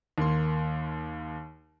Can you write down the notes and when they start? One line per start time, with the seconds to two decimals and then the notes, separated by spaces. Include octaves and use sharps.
0.18 D#2 A#3 C6